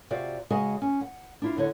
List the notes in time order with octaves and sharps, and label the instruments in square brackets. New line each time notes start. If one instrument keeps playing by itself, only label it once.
[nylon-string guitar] C3 F4 F#4 D5
C#3 G#3 F#4 G#4 D#5 F#5
C#4
F#5
D4 E4 F4
E2 D3 C#5